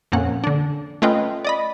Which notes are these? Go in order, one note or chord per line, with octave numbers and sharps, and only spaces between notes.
F2 A#2 A#3 C#4 F#5
D3 D4
A3 C#4 F4 B4 D#5 G5
D5 D#5 B5